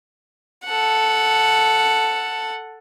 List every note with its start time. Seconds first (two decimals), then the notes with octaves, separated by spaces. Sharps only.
0.65 A4 F#5